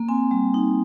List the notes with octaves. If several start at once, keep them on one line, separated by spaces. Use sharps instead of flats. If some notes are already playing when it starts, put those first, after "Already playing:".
Already playing: A#3
C4 G#5
G3
D#4